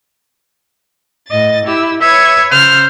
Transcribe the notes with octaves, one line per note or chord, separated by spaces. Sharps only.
A2 D#5 A6
E4 G4 E6
B4 C#5 E5 G#6
C#3 C5 F6